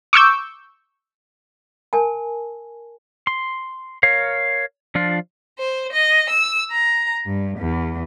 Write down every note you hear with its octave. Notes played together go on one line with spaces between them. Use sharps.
C#6 D6 E6 G6
A#4 G#5 A5
C6
A#4 C#5 F5
F3 D4 F4
C5
D#5
E6
A#5
G2
E2